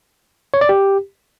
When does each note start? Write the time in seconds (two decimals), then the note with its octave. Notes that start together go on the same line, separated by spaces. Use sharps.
0.54 C#5
0.61 D5
0.69 G4